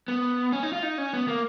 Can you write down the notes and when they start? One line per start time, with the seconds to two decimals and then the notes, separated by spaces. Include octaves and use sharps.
0.08 B3
0.53 C#4
0.63 D#4
0.73 F4
0.83 D#4
0.98 C#4
1.13 B3
1.28 A#3